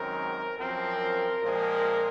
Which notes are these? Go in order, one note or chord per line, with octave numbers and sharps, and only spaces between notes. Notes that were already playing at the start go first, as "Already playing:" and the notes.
Already playing: F#2 D#3 G#3 C4 A#4
F#2 F3 C4 A#4
A#2 F3 G#3 C4